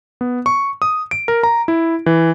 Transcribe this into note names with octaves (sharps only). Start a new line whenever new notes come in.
B3
C#6
D#6
D7
A#4
A#5
E4
E3